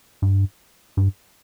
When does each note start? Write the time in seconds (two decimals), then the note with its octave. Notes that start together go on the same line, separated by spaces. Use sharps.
0.22 G2
0.97 G2